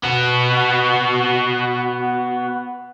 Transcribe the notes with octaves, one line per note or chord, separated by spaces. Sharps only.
B3 F#4